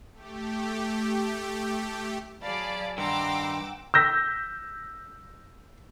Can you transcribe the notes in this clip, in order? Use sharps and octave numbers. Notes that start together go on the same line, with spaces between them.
A3 G4
F#3 G#4 D5 F5 A5 B5
G2 D#3 F#5 G5 A#5 C6 D6 E6
E6 G6 A#6 B6